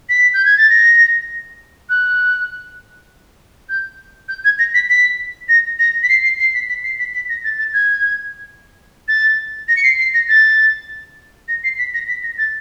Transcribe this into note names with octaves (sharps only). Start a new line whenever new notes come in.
B6
G6
G#6
A6
A#6
F#6
G6
G6
G#6
A#6
B6
B6
A#6
A#6
B6
C7
C7
C7
B6
B6
C7
B6
B6
A#6
A6
A6
G#6
A6
A#6
C#7
C7
C7
A#6
A6
A#6
C7
B6
A#6
B6
A#6
A6